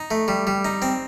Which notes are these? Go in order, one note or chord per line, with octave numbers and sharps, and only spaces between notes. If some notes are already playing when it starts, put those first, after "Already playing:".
Already playing: D#4
A3
G3
G3
D#4
C4